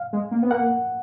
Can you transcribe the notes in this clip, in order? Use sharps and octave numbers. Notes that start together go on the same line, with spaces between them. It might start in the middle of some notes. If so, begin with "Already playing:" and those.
Already playing: F5
G#3
A#3
B3
A#3 F#5